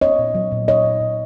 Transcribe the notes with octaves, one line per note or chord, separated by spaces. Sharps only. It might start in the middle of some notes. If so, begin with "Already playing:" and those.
B3 C#5 D#5
A#2
F#3
A#2
F#3 C#5 D#5
A#2
A#2